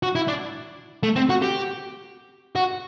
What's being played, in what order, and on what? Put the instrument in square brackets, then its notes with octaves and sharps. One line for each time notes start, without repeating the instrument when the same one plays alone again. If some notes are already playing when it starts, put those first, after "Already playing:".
[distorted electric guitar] F#4
E4
D4
A3
C4
F#4
G4
F#4